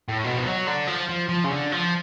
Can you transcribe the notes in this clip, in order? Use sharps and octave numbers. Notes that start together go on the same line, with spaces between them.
A2
B2
F3
F#3
D3
F3
F3
F3
C#3
D3
F3